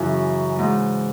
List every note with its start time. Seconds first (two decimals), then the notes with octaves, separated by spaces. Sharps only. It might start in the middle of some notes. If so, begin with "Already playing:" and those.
Already playing: F#2 C#3 E3 E4 G#4
0.56 G#2 E3